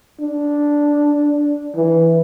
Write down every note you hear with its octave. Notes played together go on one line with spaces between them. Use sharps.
D4
E3